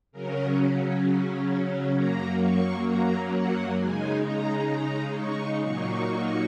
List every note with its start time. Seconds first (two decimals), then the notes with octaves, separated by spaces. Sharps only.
0.12 C#3 F#3 C#4 A#4
1.95 F#2 F#3 A#3 A#5
2.41 C#6
2.86 A#5
3.31 F#5
3.77 C#3 G#3 D#4 G#5
4.23 A#5
4.69 A#5
5.14 C#6
5.60 A#2 F#3 A#3 D#4 C#6